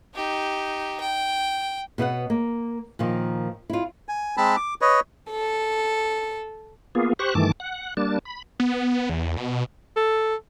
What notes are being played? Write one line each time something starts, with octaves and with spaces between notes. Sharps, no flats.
D#4 G4
G5
B2 B3 E5 F#5
A#3
A#2 D#3 F3
E4 F4
G#5
G#3 C4 A5 B5
D6
B4 C#5 D#5
A4
A#3 B3 F4 G#4
G4 C5 C#6 F#6
G2 D#3 E3 A3 A5 D6
F#5
G3 A#3 D4 A5
B5
B3
E2
B2
A4